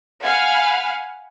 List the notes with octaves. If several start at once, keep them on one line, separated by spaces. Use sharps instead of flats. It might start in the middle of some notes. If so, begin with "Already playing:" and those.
F5 F#5 G#5 B5 F6